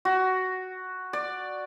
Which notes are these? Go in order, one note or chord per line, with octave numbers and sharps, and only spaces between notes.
F#4
D5